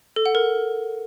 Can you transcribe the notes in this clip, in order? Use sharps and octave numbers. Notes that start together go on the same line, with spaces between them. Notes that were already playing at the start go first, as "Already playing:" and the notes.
A4
F#5
A#4